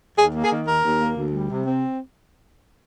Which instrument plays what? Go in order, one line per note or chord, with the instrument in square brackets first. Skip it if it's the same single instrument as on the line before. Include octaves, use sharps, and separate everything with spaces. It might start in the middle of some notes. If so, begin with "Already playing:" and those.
[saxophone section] D#2 G#4
A#3
G#4
D#3
D#2 A#4
D#2
A#3
D2
G3
C3
C4